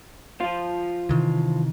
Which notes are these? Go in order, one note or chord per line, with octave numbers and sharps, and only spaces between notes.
F3 F4
C3 D#3 E3